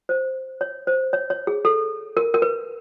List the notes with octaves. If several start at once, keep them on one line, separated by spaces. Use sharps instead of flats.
C5
C#5
C5
C#5
C#5
G#4
A4
A#4
A#4
B4